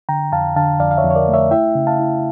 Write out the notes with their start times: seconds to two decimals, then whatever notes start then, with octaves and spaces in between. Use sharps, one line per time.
0.09 D3 G5 A#5
0.32 F2 F5 A5
0.56 D3 F5 A5
0.80 F2 D5 F5
0.91 F5
0.97 C#5 E5
1.04 F2
1.11 C#5
1.15 A#4 D5
1.28 A3
1.34 C#5 E5
1.51 E4 E5 G5
1.75 C#3
1.87 F5 A5
1.99 E4